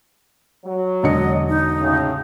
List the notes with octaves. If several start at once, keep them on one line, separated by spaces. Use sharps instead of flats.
F#3
E1 D3 D#5 C#7
D#4
A2 C#3